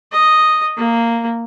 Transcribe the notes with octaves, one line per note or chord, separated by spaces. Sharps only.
D#5
A#3